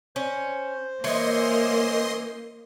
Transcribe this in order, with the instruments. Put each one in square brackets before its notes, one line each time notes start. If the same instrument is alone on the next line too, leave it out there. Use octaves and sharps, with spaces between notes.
[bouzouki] C#4 [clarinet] C5
[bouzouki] E3 C#4 [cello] A#3 [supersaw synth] D#5 C6